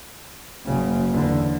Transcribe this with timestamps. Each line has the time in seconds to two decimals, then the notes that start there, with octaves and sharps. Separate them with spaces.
0.66 F#1 C#3
1.11 E2 D3